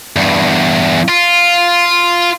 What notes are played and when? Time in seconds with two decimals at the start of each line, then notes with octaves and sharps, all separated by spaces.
0.16 E2 G2
1.08 F4